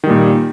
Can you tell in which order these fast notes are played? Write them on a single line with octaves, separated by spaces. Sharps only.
D#3 G3 A#2